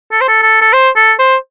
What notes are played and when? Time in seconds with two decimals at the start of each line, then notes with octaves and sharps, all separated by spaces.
0.12 A4
0.21 C5
0.28 A4
0.42 A4
0.62 A4
0.73 C5
0.96 A4
1.19 C5